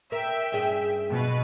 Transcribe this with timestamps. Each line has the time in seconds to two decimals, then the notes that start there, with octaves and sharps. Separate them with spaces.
0.12 A#4 E5 G5
0.52 G2 C#4 G#4
1.10 B2 B4